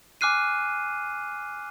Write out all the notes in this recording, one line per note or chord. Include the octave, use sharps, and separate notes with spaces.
G#5 D6 F6 F#6 C7 D#7